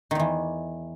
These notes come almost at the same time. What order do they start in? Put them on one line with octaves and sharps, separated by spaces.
D#3 E2 E3